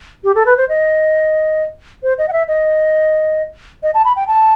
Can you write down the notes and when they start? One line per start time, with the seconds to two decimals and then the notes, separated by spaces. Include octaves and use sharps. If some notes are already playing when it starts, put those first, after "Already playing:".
0.24 G4
0.35 A4
0.46 B4
0.57 C5
0.69 D#5
2.03 C5
2.18 D#5
2.28 F#5
2.33 E5
2.48 D#5
3.83 D#5
3.94 A5
4.05 B5
4.16 G5
4.28 A5